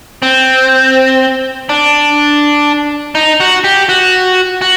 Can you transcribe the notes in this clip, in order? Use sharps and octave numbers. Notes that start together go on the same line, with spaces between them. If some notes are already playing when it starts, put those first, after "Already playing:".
C4
D4
D#4
F#4
G4
F#4
F#4